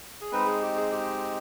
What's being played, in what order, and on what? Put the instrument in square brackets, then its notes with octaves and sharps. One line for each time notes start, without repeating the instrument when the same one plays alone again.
[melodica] G#4
G#3 C4 D#4 B4
G#4
G4
G#4
G4